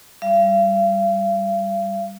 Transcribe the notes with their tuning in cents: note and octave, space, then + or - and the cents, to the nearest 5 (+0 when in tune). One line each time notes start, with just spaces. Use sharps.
G3 +0 F5 -40